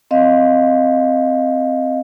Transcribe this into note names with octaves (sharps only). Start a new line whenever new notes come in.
C4 D#5 F5